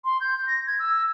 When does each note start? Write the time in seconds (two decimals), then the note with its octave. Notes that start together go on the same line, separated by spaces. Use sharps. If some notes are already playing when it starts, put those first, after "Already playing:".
0.04 C6
0.20 G6
0.47 A#6
0.67 G#6
0.79 E6